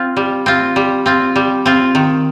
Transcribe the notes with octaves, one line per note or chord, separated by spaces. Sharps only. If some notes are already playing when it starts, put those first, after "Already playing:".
Already playing: C4 F4
G3
C4 F4
G3
C4 F4
G3
C4 F4
D#3